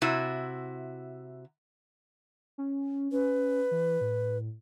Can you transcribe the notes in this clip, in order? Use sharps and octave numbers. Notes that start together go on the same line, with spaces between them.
C3 E4 F#4
C#4
C#4 B4
E3
A2